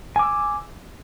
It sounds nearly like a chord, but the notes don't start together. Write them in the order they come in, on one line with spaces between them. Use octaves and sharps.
G#5 D6 E6